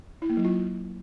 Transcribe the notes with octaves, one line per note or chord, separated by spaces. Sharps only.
E4
A#3
F#3
F4